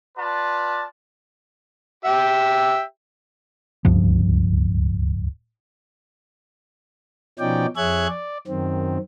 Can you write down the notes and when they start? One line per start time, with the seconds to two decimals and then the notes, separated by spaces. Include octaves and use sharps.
0.18 F4 B4 D5 A5
2.05 G4 E5 G5
3.85 D1 C#2 G2 F3
7.39 B2 F3 C#4 D#4 D5 G5
7.76 F2 G#4 C#5 E5 F#6 G#6
8.08 D5
8.48 F#2 D#3 C4